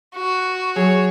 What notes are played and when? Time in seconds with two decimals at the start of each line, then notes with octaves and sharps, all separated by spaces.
0.15 F#4
0.76 F#3 G#4 C#5